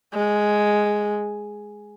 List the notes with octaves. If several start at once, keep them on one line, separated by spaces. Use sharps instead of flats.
G#3